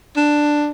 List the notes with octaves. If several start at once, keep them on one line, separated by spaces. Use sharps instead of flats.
D4